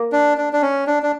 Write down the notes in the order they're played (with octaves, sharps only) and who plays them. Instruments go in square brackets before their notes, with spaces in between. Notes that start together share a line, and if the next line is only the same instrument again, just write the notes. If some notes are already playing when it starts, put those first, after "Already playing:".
Already playing: [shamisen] A#3
[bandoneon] D4
D4
D4
C#4
D4
D4